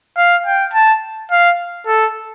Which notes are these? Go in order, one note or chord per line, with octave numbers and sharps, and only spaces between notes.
F5
G5
A5
F5
A4